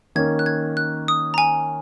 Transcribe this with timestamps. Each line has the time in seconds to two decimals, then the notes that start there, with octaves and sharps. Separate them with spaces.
0.16 D#3 A#3 C#4 G#6
0.39 F#6
0.46 G#6
0.77 F#6
1.08 D#6
1.34 A#5
1.38 G#5